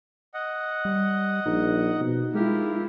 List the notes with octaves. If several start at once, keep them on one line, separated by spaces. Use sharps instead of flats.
D#5 F#5
G3
A#1 D#4
B2
G#3 E4 F4 G4 A#4